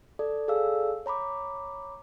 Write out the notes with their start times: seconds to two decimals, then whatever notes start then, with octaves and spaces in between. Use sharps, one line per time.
0.19 A4 D5
0.48 G#4 A4 D5 F5 E6
1.06 C#5 A#5 B5 D6